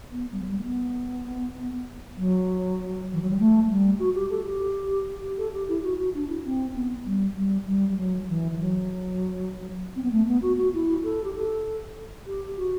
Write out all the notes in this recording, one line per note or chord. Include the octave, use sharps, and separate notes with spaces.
B3
G3
F#3
G3
A3
B3
F#3
E3
F#3
G3
A3
G3
F#4
G4
A4
G4
G4
A4
G4
E4
F#4
F#4
D4
E4
C4
B3
G3
G3
G3
G3
F#3
E3
E3
F#3
C4
B3
A3
B3
F#4
F#4
E4
A4
G4
A4
G4
F#4